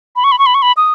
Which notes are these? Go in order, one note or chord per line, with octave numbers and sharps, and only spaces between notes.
B5
C#6
B5
C#6
B5
C#6
B5
D#6